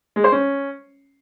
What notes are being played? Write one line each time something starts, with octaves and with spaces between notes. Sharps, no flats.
G#3
C5
C#4